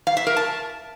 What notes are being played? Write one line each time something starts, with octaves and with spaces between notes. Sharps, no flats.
F5
E5
A#4
A5